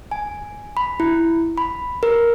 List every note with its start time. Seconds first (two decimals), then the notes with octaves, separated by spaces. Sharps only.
0.12 G#5
0.77 B5
1.00 E4
1.58 B5
2.03 A#4